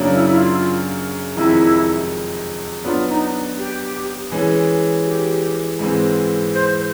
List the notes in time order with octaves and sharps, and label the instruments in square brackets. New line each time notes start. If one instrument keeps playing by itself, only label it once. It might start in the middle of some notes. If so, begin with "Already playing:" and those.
Already playing: [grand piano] F#2 C#3 F#3 A#3 D4
[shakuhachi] E4
E4
F4
[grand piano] F2 C3 D#3 G#3 [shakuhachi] E4
[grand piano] F#3 B3 D4 [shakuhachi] F4
[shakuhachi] D#4
G4
[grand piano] E3 G#3 C#4
[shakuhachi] G4
[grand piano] G#2 E3 G#3 C4
[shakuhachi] C5
C5